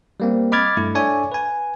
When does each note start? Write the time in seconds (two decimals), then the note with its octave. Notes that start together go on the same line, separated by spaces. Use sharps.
0.20 G3 A#3 C4
0.52 D#5 B5 D6 F6 G#6 A6
0.77 G2 A3 E4
0.95 D4 A4 C#5 D5 E5 G#5
1.32 B4 G#5